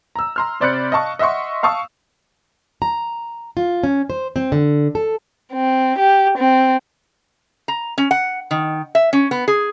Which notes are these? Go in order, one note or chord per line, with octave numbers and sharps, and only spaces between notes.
A#5 E6
A#5 C6 F6
C3 C5 D5 B5 F#6 C#7
D#5 F5 A5 C#6
D#5 E5 F#5 C6 C#6
F5 A5 C#6 D#6 E6
A#5
F4
C#4
C5
C4
D3
A4
C4
G4
C4
A#5
C#4
F#5
D#3
E5
C#4
B3
G#4